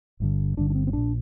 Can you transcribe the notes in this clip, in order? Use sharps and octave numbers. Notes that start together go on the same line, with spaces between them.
G1 G2 D3
G1 G2 D3 D4
D4
C4
C4
A#1 A#2 D4